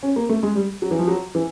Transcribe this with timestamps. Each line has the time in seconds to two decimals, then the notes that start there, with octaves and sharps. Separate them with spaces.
0.03 C#4
0.16 A#3
0.29 A3
0.43 G#3
0.55 G3
0.82 F#3
0.91 E3
0.99 F3
1.08 F#3
1.35 E3